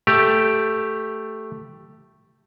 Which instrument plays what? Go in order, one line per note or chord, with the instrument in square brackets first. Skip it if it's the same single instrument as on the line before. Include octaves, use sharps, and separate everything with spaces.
[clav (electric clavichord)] A3 G4